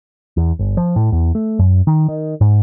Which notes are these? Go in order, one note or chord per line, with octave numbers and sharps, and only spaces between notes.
E2
G1
F3
A2
E2
A3
F#2
D#3
D#3
G#2